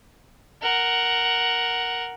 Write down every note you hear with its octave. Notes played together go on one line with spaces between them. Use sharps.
A#4 F#5